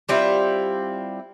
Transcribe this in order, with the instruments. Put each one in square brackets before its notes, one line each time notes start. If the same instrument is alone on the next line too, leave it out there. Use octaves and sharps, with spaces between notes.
[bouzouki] G3 C4 E4 F4